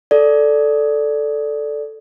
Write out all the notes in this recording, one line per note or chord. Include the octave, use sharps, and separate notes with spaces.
A4 D5